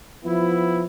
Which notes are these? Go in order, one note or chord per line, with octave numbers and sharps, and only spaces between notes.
F3 B3 E4